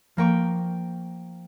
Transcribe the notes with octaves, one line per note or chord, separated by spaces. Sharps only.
F3 A#3 G5 C#6